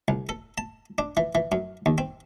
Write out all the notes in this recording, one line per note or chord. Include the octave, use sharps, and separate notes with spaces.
C2
A4
A5
D4
E3
E3
F#2
D#2
C4